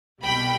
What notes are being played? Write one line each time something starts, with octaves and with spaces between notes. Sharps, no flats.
C2 B2 G3 G5 B5